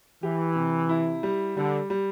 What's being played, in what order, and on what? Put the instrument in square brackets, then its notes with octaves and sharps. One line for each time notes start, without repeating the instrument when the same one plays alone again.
[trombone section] E3 [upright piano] G4
[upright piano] C3
E4
G3
[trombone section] D3 [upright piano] G3
[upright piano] G3